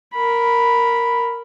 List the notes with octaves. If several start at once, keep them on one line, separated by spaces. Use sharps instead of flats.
A#4 B5